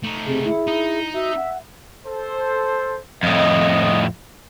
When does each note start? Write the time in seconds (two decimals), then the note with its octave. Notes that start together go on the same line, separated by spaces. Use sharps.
0.04 A3 D#4
0.26 C3 G#4
0.46 E4
0.67 D#4
1.14 F#4 E5
1.37 F#5
2.06 A4 C5
3.23 F2 A2 D#5